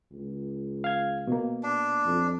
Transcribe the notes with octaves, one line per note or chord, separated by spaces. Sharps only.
C#2
F5 G#6
B2 A#3
D4
F2